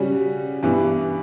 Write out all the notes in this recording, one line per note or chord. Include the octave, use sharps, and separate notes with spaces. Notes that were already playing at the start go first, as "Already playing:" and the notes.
Already playing: C#3 G3 C#4 F#4
G2 E3 B3